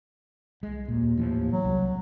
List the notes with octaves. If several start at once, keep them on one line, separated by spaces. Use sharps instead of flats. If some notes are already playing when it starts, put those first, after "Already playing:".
C2 G#3
D#2 A#2
A2 E3 F3
F#3
C2